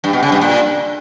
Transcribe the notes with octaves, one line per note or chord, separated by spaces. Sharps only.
G2
B2
C#3
G2
A#2